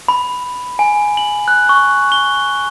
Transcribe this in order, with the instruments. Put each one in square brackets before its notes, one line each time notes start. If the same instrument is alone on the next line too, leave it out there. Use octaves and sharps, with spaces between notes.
[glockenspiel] B5
G#5
F#7
F#6
C#6
G7